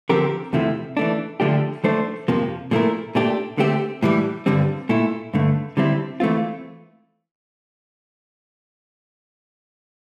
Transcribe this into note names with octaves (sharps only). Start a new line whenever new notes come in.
D3 F3 C4 G4 A#4
E2 C3 F3 A3 E4
E3 A3 D4
D3 F3 A3 D4 G4
F3 A3 D4 A4 C5
F2 C3 F3 A#3
A#2 F3 A3 E4 A#4
A#2 A3 D4 G4
D3 A3 C4 G4
A2 E3 G3
G2 D3 G3 C4
A#2 A3 E4
G2 D3 A3
D3 G3 C4 E4
E3 A3 C4 F4